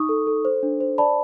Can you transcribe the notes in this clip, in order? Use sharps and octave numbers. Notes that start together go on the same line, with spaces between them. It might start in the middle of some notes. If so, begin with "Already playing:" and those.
Already playing: D#4 C#6 D#6
A4
A4
C5
D4
C5
D5 A5 B5